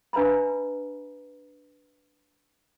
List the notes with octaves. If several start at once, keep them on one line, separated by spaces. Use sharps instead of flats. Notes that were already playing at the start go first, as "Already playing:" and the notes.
D4 B4 E5 A#5 B5